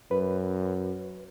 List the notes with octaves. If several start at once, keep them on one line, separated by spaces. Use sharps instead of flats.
F#2 B4